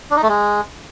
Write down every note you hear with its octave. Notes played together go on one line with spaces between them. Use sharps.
D4
D#4
A3
G#3